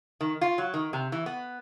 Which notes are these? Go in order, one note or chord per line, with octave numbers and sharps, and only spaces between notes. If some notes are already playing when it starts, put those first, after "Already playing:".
D#3
F4
F#3
D#3
C3
E3
B3